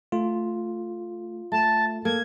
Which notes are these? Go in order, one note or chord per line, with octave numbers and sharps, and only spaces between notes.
A3 F4
A3 A5
A#3 A4 G#6